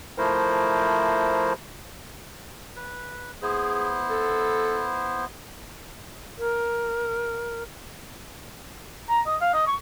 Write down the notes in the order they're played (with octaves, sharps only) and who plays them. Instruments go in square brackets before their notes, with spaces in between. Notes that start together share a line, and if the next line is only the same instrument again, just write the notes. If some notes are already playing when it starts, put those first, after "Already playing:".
[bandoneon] F3 A3 E4 A#4 C5
[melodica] B4
[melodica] B3 E4 C5 [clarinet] G#4
[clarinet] A4
[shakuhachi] A#4
[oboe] A#5
D#5
F5
D#5
C#6